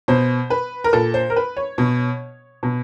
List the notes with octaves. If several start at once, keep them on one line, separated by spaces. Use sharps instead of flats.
B2 C5
B4
A#4
A#2 A4
C5
A#4
B4
C#5
B2
B2